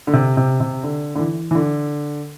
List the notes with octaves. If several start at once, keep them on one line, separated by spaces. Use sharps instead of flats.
D3
C3
C3
C3
D3
D3
E3
E3
D3